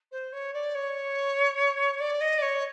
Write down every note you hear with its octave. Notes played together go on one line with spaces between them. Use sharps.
C5
C#5
D5
C#5
D5
D#5
D5
C#5